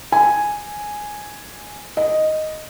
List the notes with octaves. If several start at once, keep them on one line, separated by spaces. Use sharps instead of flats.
G#5
D#5